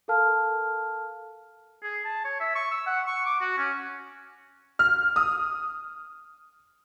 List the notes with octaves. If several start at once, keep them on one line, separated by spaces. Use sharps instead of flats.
A4 A#4 F5 A5 F6
G#4
A5
C#5
E5
C#6
E6
F#5
C#6
D6
F#4
C#4
F6
D#6